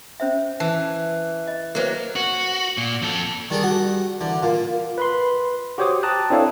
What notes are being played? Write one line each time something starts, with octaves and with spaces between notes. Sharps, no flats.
C#4 C5 E5
E3 A5
D#5
F#3 A#3 E4 B4 C5
F#4
A#2
F2 A4
D#3 G3 D4 G#4
F#4
D3 E3
A#2 F5
B4 B5 C6
F#4 G4 C5 C#5 D6 D#6
G5 A5 A#5 D#6 F#6
C4 D4 E4 A4 C#5 F5